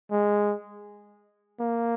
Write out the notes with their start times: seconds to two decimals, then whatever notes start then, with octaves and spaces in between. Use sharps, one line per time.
0.11 G#3
1.59 A#3